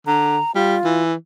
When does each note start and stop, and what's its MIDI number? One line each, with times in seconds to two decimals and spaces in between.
0.07 0.38 50
0.07 0.51 82
0.55 0.76 55
0.55 1.03 65
0.84 1.13 52